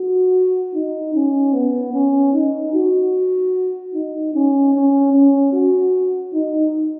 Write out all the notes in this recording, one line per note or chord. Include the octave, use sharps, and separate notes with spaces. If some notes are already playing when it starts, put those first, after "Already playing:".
Already playing: F#4
D#4
C#4
B3
C#4
D#4
F#4
D#4
C#4
C#4
C#4
F#4
D#4